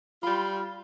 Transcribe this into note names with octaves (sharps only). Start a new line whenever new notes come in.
G3 F4 B5